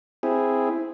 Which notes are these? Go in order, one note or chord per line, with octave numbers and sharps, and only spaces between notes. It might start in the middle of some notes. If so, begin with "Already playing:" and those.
C4 E4 G#4